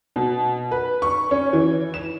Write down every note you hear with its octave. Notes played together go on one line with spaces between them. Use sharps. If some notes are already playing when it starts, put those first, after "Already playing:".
B2
B4
C#6
C#4
E3
E7